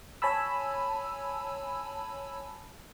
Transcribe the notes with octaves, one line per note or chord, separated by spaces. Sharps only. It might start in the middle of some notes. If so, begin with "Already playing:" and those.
C#5 G#5 A5 B5 E6